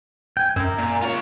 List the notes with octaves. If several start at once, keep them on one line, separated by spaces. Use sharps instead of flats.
G5 G#5
F#2 A#4 E5
A#2
F4 C#5